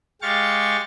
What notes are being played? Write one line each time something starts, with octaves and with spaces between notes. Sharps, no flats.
G#3 G4 F5 C#6 A6